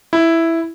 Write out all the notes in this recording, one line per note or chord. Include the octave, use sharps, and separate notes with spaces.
E4